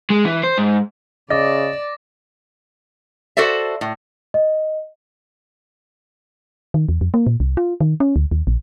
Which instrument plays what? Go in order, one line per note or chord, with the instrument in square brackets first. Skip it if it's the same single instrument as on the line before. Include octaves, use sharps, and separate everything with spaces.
[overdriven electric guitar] G#3
E3
C5
G#2
[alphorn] C#3 [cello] D5 [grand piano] D#5 [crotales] D6 A6 A#6
[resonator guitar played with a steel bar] F#4 A4 C5 D5 E5
A2
[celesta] D#5
[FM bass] D#3
E2
F2
A#3
A#2
C2
F4
D#3
C#4
D2
D#2
A#1